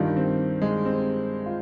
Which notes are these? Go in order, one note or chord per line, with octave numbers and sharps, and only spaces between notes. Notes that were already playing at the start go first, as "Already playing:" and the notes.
Already playing: G2 D#3 G3 F4
C4
G#3
C4
F4